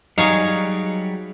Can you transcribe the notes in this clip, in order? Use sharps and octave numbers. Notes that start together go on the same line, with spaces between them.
F#3 G3 D#4 G#4 C#5 F5